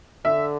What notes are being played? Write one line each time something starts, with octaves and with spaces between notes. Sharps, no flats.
D3 E5